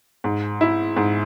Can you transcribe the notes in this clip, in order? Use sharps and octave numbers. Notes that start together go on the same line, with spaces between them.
G#2
E4
G#2